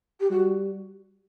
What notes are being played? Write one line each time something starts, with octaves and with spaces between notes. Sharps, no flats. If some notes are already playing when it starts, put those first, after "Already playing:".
G4
G3 F#4